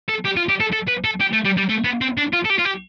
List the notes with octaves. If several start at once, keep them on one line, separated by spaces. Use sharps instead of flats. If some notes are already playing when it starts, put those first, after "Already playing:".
A4
G4
F4
G4
A4
A4
B4
A4
G4
A3
G3
G3
A3
B3
C4
D4
F4
A4
G4
F4
G4